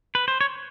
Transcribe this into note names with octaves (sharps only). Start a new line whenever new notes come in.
B4
C5
C#5